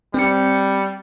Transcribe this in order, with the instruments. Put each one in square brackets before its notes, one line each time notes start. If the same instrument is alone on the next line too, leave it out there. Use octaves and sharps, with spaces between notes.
[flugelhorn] G3 [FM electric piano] C4 C#7